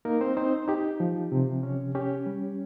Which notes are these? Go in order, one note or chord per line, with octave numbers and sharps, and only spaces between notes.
A#3 D#4 A#4
C4 C5
C4 D#4 C5
D#4 G4
F3
C3
C#4
C#4 G4
G3